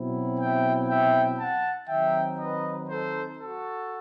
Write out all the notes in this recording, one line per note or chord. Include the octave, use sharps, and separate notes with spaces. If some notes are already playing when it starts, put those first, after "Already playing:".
Already playing: B2 F#3 C4 E4
E5 G5
E5 G5
F#5 A5
D#3 F#3 C4 D#4 E5 G5
B4 D#5
A4 C5
F#4 A4